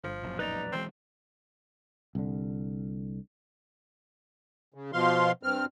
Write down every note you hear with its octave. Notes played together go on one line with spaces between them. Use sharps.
G1 F3
E1 A#1 F#2
D#4 B4 D5 A#5
B1 E3 G#3 C4
C2 D3
C#3
B2 F3 F5 C6
G2 C4 F6